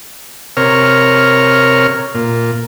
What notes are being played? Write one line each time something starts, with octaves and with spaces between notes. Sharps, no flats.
C3 A#4 C#5 F6
A#2